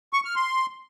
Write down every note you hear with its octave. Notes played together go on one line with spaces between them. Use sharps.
C#6
F6
C6